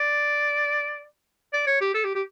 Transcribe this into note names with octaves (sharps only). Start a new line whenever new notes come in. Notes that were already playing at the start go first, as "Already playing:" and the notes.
Already playing: D5
D5
C#5
G4
A4
G4
G4